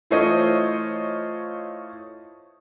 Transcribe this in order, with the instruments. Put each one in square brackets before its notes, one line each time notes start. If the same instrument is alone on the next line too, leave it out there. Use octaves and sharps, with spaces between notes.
[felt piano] E3 A3 F4 C5 C#5 D#5